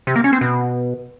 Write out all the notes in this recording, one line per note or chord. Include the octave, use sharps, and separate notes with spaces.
C3
A#3
C#4
C4
B2